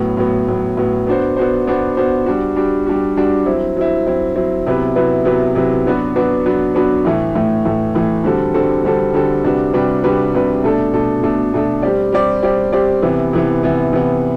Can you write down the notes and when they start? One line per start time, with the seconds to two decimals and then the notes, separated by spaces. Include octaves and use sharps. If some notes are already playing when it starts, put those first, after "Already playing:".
Already playing: A2 F#3 B3
0.17 A2 F#3 B3
0.48 A2 F#3 B3
0.77 A2 F#3 B3
1.07 B3 D4 F#4 C5
1.37 B3 D4 F#4 C5
1.67 B3 D4 F#4 C5
1.97 B3 D4 F#4 C5
2.26 G3 D4 F#4
2.56 G3 D4 F#4
2.86 G3 D4 F#4
3.17 G3 D4 F#4
3.46 F#3 C4 E4
3.76 F#3 C4 E4
4.07 F#3 C4 E4
4.36 F#3 C4 E4
4.66 C3 F#3 B3 E4 B4
4.96 C3 F#3 B3 E4 B4
5.25 C3 F#3 B3 E4 B4
5.55 C3 F#3 B3 E4 B4
5.86 F#3 B3 D4 F#4 B4
6.16 F#3 B3 D4 F#4 B4
6.46 F#3 B3 D4 F#4 B4
6.75 F#3 B3 D4 F#4 B4
7.05 A2 E3 A3
7.35 A2 E3 A3
7.65 A2 E3 A3
7.95 A2 E3 A3
8.24 D3 G3 C4 F#4 A4
8.54 D3 G3 C4 F#4 A4
8.84 D3 G3 C4 F#4 A4
9.14 D3 G3 C4 F#4 A4
9.44 C3 G3 D4 F#4 B4
9.74 C3 G3 D4 F#4 B4
10.04 C3 G3 D4 F#4 B4
10.34 C3 G3 D4 F#4 B4
10.63 B2 A3 D4 A4
10.93 B2 A3 D4 A4
11.23 B2 A3 D4 A4
11.53 B2 A3 D4 A4
11.83 G3 C4 G4 D5
12.12 G3 C4 G4 D5
12.43 G3 C4 G4 D5
12.73 G3 C4 G4 D5
13.02 C3 E3 B3
13.33 C3 E3 B3
13.63 C3 E3 B3
13.93 C3 E3 B3